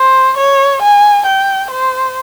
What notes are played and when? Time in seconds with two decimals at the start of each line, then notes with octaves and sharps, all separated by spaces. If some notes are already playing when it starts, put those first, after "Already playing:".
Already playing: C5
0.37 C#5
0.82 G#5
1.26 G5
1.70 C5